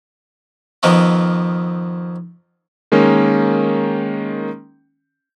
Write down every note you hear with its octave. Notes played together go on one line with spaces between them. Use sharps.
F2 D#3 F3 B3 C4
D#3 G#3 A#3 C#4